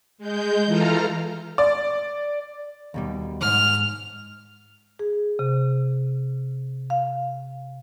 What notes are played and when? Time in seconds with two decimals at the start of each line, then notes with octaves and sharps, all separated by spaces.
0.18 G#3 G6
0.66 E3 F4 A4 A#5 F6
1.58 D5
2.94 D#2 B2 G3
3.41 D#2 G#2 F6
4.99 G#4
5.39 C3
6.90 F5